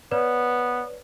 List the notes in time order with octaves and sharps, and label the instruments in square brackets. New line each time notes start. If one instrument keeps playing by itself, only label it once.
[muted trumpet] B3 [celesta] B4 C#5 D5